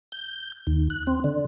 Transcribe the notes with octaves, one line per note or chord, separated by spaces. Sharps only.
G6
D#2
F#6
C4
D3